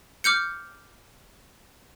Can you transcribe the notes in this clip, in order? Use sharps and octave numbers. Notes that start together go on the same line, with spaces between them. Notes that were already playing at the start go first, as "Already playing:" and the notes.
D6 F6 G6 C#7